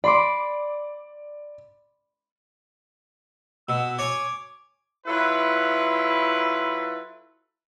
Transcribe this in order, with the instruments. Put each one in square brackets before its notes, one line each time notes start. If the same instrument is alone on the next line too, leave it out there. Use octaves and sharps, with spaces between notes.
[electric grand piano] D5 [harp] B5 C6 D6
[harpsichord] B2 [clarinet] E6
[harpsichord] C#5 G#5 [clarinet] D6
[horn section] F#3 E4 F4 A4 B4